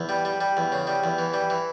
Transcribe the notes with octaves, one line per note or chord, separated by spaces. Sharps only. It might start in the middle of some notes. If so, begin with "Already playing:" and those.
Already playing: E2
G3
G3
G3
E2
C#3
G3
E2
E3
G3
E3